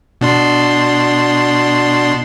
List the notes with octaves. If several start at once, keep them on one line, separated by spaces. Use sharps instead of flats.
B2 D4 C6